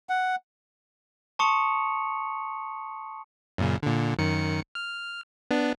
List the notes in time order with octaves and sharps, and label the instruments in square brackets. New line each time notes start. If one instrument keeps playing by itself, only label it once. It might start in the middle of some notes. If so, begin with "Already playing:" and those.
[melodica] F#5
[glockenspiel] A5 C6 C#6 D#6 C#7 F7
[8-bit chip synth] F#2 A#2 C#3
A#2 D3
F#2 D#3 C#7
F6
B3 D4